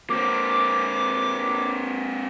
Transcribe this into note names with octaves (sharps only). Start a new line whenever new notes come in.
A#3 C4 D6